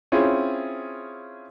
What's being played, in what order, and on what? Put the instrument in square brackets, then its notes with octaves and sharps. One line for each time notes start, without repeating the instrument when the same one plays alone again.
[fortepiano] C4 C#4 E4 F4 G#4